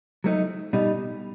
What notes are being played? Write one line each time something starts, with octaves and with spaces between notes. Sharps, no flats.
F#3 A3 C4 D#4
B2 G3 D#4